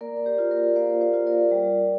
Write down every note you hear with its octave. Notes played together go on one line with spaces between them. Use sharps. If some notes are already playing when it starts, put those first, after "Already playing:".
A#3 A#4 D5
D5
G4 C5
F4
A#4 D5
A#3 C5 F5
C5 F5
F4
A#4 D5
G3